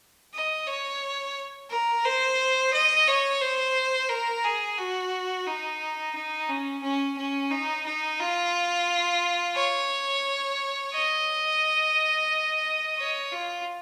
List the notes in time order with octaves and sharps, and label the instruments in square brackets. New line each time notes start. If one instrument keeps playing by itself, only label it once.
[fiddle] D#5
C#5
A#4
C5
D#5
C#5
C5
A#4
G#4
F#4
D#4
D#4
C#4
C#4
C#4
D#4
D#4
F4
C#5
D#5
C#5
F4